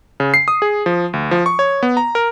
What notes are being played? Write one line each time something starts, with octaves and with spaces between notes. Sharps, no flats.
C#3
C7
D#6
G#4
F3
D2
F3
C#6
C#5
B3
A#5
A#4